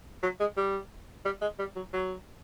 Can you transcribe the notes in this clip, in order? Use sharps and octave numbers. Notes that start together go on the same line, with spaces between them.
F#3
G#3
G3
G3
G#3
G3
F#3
F#3